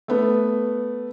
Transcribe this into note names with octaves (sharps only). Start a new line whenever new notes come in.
A3 B3